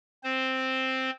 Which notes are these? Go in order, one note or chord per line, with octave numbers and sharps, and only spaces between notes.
C4 C5